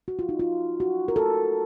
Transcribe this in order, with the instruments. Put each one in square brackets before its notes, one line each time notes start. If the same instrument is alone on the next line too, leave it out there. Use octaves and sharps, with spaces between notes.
[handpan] F#4
F4
D#4
F4
F#4
A#4
A4